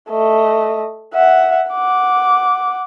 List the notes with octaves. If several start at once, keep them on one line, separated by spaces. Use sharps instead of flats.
A3 D#5
E5 F#5
F#5 D6